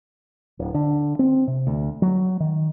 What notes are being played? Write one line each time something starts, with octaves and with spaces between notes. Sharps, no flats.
D1
D3
C4
C3
D2
F#3
D#3